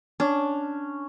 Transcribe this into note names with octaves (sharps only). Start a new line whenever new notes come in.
C#4 D4